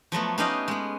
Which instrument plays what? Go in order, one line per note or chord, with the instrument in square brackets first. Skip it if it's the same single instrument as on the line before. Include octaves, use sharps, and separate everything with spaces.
[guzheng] F3 F#3 A3 B3
B3 C#4 D#4 G4 D#5 F5
G#3 B3